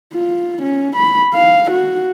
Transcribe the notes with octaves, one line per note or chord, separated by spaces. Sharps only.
F4
C#4
B5
F5
F#4